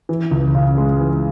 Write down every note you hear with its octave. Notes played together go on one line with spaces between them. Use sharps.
E3
C#2
C#3
G#3
E3